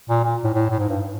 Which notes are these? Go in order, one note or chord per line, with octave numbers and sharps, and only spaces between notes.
A#2
A#2
A2
A2
A2
G#2
G2